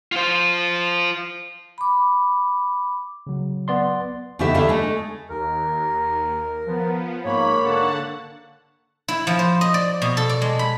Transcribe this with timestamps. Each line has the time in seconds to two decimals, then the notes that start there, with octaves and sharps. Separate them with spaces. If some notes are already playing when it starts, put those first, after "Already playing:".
0.12 F4 C5
1.78 B5 D6
3.26 C#3 F#3
3.68 B3 D5 C6
4.39 E2 C#3 A3 D#4 G4 E5
4.54 E2 D3 E5
4.69 G#3 A3
5.29 D#2 A#4
6.66 F3 B3
7.24 G#2 A#3 C#5 B5
7.64 D3 F#5 A5
9.08 E4
9.27 F3
9.39 C5
9.61 D#5
9.74 D5
10.02 B2
10.17 A4
10.29 D5
10.42 G#3
10.59 B5